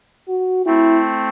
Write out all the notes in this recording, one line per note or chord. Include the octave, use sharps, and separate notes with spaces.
F#4
A3 C4 E4